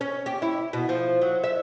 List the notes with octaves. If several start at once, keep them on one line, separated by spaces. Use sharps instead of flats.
C#4
G4
E4
B2
F3
F#3
E5